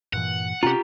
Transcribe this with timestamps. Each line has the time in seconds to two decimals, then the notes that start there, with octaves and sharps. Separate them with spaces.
0.13 G2 A#2 E3 F#5
0.63 C3 C4 C#4 F4 G4 A#5